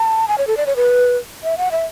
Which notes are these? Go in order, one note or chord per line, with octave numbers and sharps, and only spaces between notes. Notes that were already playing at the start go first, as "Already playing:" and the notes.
Already playing: A5
G#5
C#5
A4
D5
C#5
B4
E5
F#5
E5